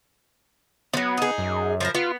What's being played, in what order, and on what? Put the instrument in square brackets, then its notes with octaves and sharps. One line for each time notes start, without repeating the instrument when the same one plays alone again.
[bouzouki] F3 F#3 [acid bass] B3
[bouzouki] D#4 G#4
[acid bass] F#2
[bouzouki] F3 E4 A#4
[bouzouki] B3 [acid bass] F4